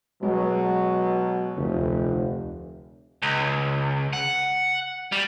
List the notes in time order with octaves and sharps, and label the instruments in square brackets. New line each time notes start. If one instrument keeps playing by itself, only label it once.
[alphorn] B2 [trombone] F#3 [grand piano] G#3
[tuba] F1 [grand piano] D2
[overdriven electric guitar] C#2
F#5
G3